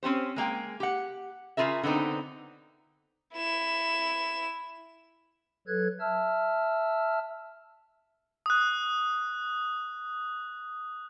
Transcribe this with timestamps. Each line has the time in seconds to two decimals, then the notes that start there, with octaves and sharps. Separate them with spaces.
0.03 C4 C#4 G4 C5
0.36 G#3 A#3 G#4 G5
0.80 G4 F#5
1.57 C#3 C#4 F4 G#4 A#4 E5
1.83 D3 B3 C4 D#4
3.34 E4 E7
5.67 F#3 A4 B4 F#6 G#6
6.00 E5 A5 E6 F6
8.46 D#6 F#6